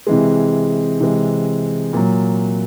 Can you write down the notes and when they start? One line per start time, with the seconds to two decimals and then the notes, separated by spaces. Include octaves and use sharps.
0.07 C3 E3 G#3
1.01 C3 E3 G#3
1.93 A#2 F#3